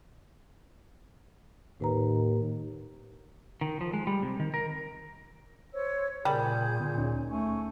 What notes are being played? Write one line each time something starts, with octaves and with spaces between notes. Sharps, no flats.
D#2 A2 B4 A#5
D#3
F3
G#3
G3
C3
D#3
A#4
C5 C#5 E6
A#2 C#3 G3 G#4 A#4 G#5 G6
A#2 D3 B3
D2 C#4 D#4
A3 G#5 C#6